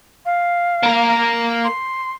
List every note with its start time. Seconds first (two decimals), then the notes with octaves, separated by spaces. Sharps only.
0.25 F5
0.83 A#3 A#4
1.64 C6